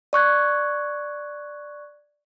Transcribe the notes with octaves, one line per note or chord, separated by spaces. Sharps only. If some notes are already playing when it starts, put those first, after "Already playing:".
D5 C#6 F#6 G#6